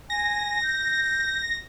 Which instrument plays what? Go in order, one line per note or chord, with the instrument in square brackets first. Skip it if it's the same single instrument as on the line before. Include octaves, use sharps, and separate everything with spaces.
[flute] G#5 [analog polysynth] A#6
[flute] G6